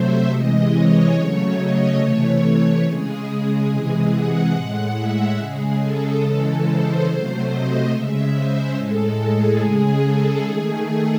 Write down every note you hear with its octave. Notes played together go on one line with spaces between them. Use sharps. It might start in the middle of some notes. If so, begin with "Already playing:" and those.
Already playing: C3 F#3 A3 C5 E5
C3 E3 G#3 D#5
C#5
C#3 F#3 A3
D#5
C3 E3 A3 C#5
C#3 G#3 G#4
G#4
C3 E3 G#3
F#5
A2 G#3
E5
C#3 G#3 G#4
A4
C#3 E3 G#3
C5
C3 F#3 A3 C5
D#5
C#3 G#3 E5
C5
A2 G#3 A4
G#4
C#3 G#3 G#4
A4
D#3 A3 G#4
A4